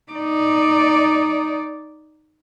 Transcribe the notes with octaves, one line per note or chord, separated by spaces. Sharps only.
D#4 D5